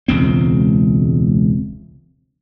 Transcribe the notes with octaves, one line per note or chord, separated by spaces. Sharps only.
E1 C#2 C4